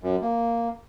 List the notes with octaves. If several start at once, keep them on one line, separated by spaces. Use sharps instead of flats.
F#2
A#3